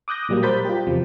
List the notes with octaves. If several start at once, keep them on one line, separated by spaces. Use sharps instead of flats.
D6 D#6 F#6 G6 A#6
A#2 F#3 G3 A#3
A#4 C5 B5 G6 A6 B6
F4 G4
E2 C3 F3